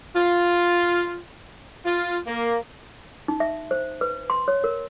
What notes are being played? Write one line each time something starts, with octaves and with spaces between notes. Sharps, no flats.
F4
F4
A#3
D#4
E5
C5
B4
C6
C#5
A#4